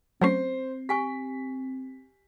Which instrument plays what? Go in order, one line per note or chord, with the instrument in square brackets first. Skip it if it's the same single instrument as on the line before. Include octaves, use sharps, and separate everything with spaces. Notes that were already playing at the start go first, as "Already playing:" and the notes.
[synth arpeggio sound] F#3 A3 C#4 [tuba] C4 [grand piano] C5 C7
[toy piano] G4 G#5 C#6 [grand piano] B6